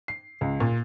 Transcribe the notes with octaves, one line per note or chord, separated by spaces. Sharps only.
C7
C#2
A#2